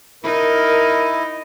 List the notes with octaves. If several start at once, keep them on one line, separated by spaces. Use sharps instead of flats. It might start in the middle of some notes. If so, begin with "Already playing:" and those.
D#4 E4 A#4